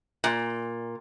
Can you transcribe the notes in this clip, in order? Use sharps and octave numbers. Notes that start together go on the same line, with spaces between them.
A#2